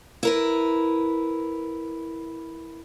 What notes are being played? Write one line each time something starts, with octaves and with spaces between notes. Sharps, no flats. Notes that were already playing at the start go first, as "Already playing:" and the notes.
E4 A#4 B4